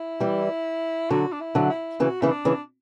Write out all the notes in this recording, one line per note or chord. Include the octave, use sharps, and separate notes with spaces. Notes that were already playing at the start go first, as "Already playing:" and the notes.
Already playing: E4
E3 G3
D3 F#3 F#4
D4
E4
D3 F#3
E4
C#3 E3 F#4
C#3 E3 E4
D4
C#3 E3